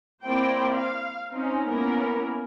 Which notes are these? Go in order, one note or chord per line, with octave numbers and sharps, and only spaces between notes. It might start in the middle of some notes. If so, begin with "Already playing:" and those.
A#3 C4 E4 C5 D5 G5
F5
C4 C#4 D#4
A#3 B3 C#4 E4 A#4